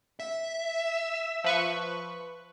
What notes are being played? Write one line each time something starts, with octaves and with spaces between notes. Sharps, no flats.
E5
F3 B4 C#6